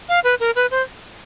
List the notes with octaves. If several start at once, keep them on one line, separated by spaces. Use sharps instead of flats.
F5
B4
A#4
B4
C5